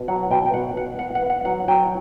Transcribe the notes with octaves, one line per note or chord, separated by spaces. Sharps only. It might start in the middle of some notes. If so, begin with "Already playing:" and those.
Already playing: B2
F#3 F#5
B2 G5
G5
B2 F#5
B2 F#5
B3 F#5
F#5
B3
F#5
F#3 F#5
F#3 G5